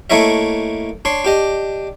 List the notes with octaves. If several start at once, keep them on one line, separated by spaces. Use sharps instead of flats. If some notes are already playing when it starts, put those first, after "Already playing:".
A3 A#3 E4 C#5 D#5 E5
D4 C#5 C6
D4 G4 D#5